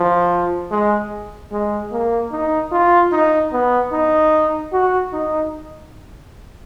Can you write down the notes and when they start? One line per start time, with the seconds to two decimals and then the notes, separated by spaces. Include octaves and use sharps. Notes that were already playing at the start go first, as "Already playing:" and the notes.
Already playing: F3
0.71 G#3
1.52 G#3
1.92 A#3
2.32 D#4
2.72 F4
3.12 D#4
3.53 B3
3.92 D#4
4.73 F#4
5.13 D#4